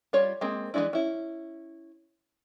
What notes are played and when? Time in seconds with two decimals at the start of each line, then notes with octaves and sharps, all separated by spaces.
0.13 G3 F4 C#5
0.41 G#3 A#3 C4
0.74 E3 F3 G#3 D4 E4
0.93 C#4 E4